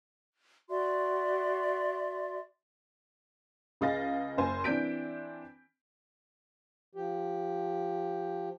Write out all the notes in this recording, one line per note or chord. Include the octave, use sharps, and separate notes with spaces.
F#4 D5 E5 C6
C#2 G#4 D#5 F5 A6 A#6
F#1 C5 G#5
E3 C4 D4 G6 B6 D7
F3 G4